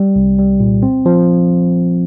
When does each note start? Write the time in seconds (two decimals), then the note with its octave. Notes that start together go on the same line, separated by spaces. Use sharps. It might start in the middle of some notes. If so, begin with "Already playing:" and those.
Already playing: G3
0.16 C2
0.39 G3
0.60 A#2
0.83 C4
1.06 F3